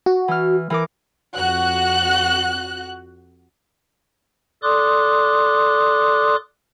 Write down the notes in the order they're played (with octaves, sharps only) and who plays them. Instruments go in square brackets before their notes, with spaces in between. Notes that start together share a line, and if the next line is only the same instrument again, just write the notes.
[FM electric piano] F#4
[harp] E3 F6
E3 A#4 D6
[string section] F2 F#4 F#6
[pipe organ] A4 D5 C6 D6 D#6 F#6